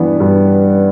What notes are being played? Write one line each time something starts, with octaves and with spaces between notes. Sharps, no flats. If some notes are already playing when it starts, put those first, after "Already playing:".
Already playing: G2 E3 B3 D4
G2